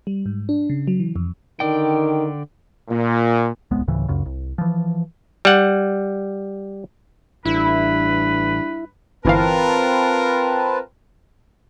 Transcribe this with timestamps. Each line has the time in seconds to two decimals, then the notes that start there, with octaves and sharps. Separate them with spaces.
0.07 G3
0.26 G#2
0.49 D4
0.70 C#3
0.87 F#3
0.99 E3
1.16 F2
1.60 D3 D#3 D5 G5
2.89 A#2
3.71 D1 C2 G#3 B3
3.88 D2 A2 C#3 E3
4.08 C#2 F#2 C#3
4.26 C2
4.58 E3 F3
5.45 G3 F#5
7.45 A1 G2 E4 B4
9.25 G1 E3 C4 F4 A#4 B4 F5 A5